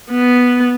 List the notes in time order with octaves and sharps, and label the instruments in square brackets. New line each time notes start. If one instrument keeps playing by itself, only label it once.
[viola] B3